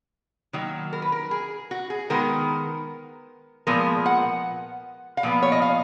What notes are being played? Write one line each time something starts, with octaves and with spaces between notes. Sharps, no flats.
D#3 F#3 A#3
A#4
B4
A#4
G#4
F#4
G#4
D#3 G#3 B3 A#4
A#2 F3 G#3 B3 A#4
F#5
F5
A#2 F3 B3
C#5
D#5
F5